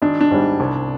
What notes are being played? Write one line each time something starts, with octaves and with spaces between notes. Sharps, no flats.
G#1 D4
D4
G#2 G3
C2